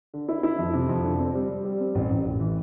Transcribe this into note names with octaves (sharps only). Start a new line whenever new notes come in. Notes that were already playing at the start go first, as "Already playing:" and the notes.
D3
E4
E4
F2
C3
F2
D3
C4
G3
G3
G3
C4
A1
A1
A1
E3